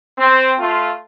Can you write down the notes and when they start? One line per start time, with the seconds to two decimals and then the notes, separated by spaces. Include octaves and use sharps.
0.18 C4
0.59 A3 F4